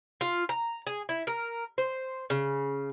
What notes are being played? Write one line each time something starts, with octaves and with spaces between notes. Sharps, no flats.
F4
A#5
G#4
E4
A#4
C5
C#3